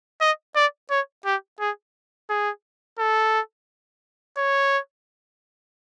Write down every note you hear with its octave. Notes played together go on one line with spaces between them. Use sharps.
D#5
D5
C#5
G4
G#4
G#4
A4
C#5